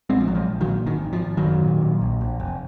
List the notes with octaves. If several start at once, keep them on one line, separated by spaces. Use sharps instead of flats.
A#1 G#3 C4
F3
A#1 F#3
F3 G#3
A#1
D#3 F#3
A#2
G#1 D#3
G#1
F3
G#1
D#3 F#3
F#2
A#2
A#2
A#1
A#1
F1